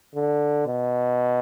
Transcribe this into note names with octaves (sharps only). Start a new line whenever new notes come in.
D3
B2